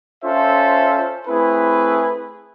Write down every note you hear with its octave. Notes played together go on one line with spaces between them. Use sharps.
C#4 F4 A4 C5 E5
A3 C4 E4 G#4 B4